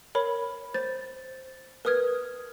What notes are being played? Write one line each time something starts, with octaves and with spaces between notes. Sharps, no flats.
A#4 C#5 B5
C5 A6
A#4 B4 D#6 F6 G#6